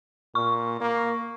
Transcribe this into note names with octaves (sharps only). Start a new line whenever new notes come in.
A#2 C#6
A#3